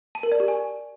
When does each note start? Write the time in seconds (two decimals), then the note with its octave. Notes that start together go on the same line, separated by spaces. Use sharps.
0.15 A5
0.23 A#4
0.32 D5
0.40 G4
0.48 G#5